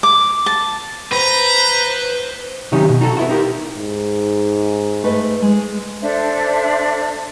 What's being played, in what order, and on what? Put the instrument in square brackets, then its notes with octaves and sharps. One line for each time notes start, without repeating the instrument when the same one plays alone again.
[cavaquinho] D6
A5
[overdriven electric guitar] B4 [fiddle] C5 [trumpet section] A#5
[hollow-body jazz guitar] C3 D#3 F#3 C#4 D#4 G4
B2
D#4 F#4 G#4 A4
B3 E4 F#4
D#4 G4 A#4
[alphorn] G#2
[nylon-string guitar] A3 B4 D#5
G#3
[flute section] D4 A4 C5 E5